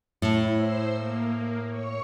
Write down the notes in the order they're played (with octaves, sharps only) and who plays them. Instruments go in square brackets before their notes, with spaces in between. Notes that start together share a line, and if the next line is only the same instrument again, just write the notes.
[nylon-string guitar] A2 [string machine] E4
[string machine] C5 E6 C7
A#3
C#5 C#6